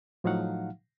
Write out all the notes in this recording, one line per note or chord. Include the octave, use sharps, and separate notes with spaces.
A2 F3 F#3 D#4 F5 F#5